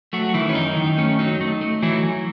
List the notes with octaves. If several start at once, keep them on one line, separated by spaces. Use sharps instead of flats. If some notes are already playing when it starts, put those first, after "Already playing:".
F#3 A3 F#4
D#3 E3 E4
C#4
F#2 D#4
D#3
A3 C#4
F#3 D#4
A3
A3
E3 F#3 E4